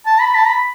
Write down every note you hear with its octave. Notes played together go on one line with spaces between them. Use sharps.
A5
B5
A5
B5